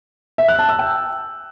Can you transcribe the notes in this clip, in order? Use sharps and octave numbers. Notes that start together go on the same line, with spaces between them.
E5
F#6
A5
E6
G5